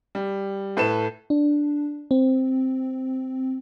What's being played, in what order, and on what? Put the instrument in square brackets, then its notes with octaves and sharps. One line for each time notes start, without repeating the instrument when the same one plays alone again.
[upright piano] G3
A2 A4 B4 E7
[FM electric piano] D4
C4